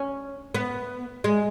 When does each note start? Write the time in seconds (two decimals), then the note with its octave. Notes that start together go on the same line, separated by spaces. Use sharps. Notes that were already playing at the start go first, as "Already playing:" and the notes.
Already playing: C#4
0.54 B3
1.24 G#3